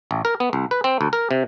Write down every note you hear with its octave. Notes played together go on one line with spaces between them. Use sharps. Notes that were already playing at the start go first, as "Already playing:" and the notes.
A1
A#4
B3
C2
B4
C4
D2
A#4
C3